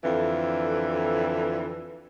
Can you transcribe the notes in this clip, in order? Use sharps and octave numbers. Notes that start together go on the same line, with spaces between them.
F2 D3 E3 A4